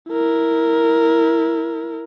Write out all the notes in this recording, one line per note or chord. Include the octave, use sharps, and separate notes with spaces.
E4 A#4